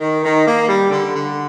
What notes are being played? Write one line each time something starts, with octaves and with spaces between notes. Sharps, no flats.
D#3
D#3
A#3
G3
D3
D3